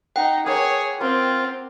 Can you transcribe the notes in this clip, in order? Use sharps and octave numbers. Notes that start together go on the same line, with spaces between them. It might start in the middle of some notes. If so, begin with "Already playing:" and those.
D#4 F#5 G5
A#3 G#4 B4 C#5 A5
A#3 C4 F4 C6